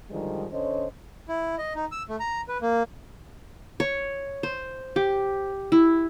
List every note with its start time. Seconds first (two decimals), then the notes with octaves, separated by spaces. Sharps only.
0.10 G#2 D3 D#3 F3 G3
0.52 D3 C#4 C5 C#5 D#5
1.28 E4
1.58 D#5
1.75 D#4
1.92 E6
2.09 A3
2.20 A#5
2.48 B4
2.62 A#3
3.80 C#5
4.43 C5
4.96 G4
5.72 E4